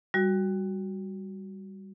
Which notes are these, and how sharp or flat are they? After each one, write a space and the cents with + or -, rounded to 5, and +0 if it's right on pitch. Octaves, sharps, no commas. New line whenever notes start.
G3 +0 F#4 +0